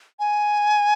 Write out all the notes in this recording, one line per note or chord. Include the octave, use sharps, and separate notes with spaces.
G#5